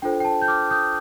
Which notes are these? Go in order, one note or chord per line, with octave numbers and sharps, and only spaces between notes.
D4 F4 A4 C5 G5
G5
A5
G6
D6 F6
D#6 G6